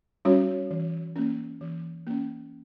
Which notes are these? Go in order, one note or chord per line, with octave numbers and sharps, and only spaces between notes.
G3 C#4 F#4 C#5
E3
A#3 C#4
E3
A#3 C#4